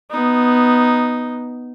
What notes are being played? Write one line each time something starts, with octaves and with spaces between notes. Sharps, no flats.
B3 D#4